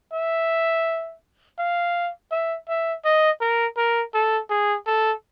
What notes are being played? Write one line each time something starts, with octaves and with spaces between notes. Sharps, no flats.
E5
F5
E5
E5
D#5
A#4
A#4
A4
G#4
A4